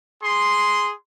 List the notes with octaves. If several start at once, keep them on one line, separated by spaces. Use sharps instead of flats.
G#4 C6